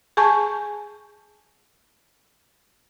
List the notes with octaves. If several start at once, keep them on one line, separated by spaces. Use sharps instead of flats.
G#4 G#5 A5 C#6 G6